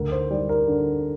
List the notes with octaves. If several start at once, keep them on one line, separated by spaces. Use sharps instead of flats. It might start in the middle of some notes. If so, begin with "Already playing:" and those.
Already playing: D2 A#4
C5
G3 D5
A#4
D3